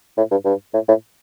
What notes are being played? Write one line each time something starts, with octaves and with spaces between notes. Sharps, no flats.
A2
G2
G2
A2
A2